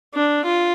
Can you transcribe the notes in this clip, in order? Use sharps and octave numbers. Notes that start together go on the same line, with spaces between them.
D4
F4